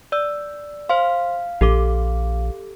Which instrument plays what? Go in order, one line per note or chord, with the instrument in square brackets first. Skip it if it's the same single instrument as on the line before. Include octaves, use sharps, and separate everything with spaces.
[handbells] D5 E6
[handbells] C5 C6 [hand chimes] F5
[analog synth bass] A#1 [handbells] G4 A4 D6